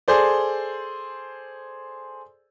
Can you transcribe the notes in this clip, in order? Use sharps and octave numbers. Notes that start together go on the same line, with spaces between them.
G#4 A4 C5 D5